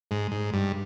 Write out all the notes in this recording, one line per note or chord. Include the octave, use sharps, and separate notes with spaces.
G#2
G#2
G2